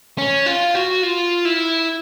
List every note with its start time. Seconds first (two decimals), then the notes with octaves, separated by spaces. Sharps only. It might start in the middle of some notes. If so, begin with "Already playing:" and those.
0.18 C#4
0.46 F4
0.75 F#4
1.03 F4
1.45 E4